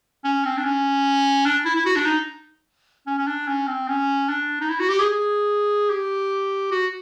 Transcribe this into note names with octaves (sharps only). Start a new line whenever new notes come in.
C#4
C4
D4
C#4
D4
E4
E4
F#4
D4
D#4
C#4
C#4
D4
C#4
C4
C#4
D4
D#4
E4
F#4
G4
G#4
G#4
G4
F#4